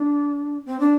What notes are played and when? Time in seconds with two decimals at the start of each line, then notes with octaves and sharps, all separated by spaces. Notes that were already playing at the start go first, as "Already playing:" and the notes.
Already playing: D4
0.66 C4
0.80 D4